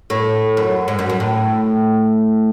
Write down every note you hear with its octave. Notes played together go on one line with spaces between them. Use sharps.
A2
F#2
G#2
F#2
F#2
A2